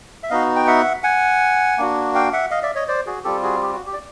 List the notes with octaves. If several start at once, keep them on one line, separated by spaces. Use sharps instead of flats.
E5
B3 D#4 F#4 D#5 F5
G5
E5 F#5
F#5 G#5
A#3 D4 F#4
F5 G5
E5 F#5
D#5 F5
D5 E5
C#5 D#5
C5 D5
F#4 G#4
G3 C4 F4 G4 A4
F#4 G#4
G4
F#4
G4
D5